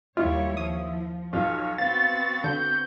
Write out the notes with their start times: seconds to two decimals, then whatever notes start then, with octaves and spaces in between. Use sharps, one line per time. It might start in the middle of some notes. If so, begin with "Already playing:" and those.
0.17 D#2 G3 E4 F4 C#5
0.57 F3 D#6
1.33 B1 F4 C#5
1.78 B3 C4 F#4 F5 A6
2.44 D3 G6